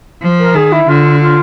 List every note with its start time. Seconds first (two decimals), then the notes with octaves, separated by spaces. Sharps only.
0.22 F3
0.39 A#4
0.55 D#3 G#4
0.72 E4
0.88 D3 F4
1.19 F4